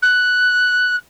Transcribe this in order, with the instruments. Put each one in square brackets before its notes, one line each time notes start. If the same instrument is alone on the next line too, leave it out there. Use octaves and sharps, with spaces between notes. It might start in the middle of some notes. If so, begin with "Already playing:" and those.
[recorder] F#6